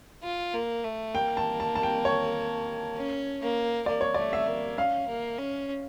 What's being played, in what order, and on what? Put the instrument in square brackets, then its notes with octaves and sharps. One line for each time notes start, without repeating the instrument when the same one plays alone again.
[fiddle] F4
A#3
A3
[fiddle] A#3 [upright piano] G5
[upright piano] A5
A5
A5
G5
C#5
[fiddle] C#4
A#3
[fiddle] A#3 [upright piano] D5
[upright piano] C#5
[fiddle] A3 [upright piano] D5
[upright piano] E5
[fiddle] A#3
[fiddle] C#4 [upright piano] F5
[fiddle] A#3
C#4